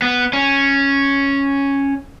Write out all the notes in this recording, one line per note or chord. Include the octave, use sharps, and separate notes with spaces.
B3
C#4